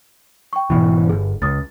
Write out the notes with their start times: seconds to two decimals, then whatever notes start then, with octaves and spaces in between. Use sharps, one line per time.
0.53 G5 C#6
0.70 G#1 B2 E3
1.09 G1 G#4
1.42 C#2 D6 D#6 A6